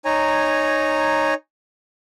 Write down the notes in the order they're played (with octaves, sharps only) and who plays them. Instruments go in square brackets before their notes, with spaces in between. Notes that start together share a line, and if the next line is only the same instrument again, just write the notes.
[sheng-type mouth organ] D#4 C#5 G#5 A#5